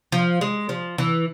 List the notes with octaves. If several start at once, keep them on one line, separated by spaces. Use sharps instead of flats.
F3
G#3
F3
E3